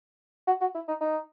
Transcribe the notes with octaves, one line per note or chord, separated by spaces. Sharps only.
F#4
F#4
E4
D#4
D#4